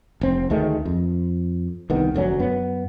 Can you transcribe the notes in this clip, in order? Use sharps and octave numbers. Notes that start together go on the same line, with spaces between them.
F1 C4
D2 D#3 G#3 A3
F2
C2 D#3 B3
F1 D2 F#3 C#4
F#2 B3